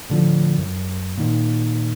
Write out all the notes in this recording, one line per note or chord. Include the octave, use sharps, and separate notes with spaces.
A2 D3 F3
F#2
A#2 D#3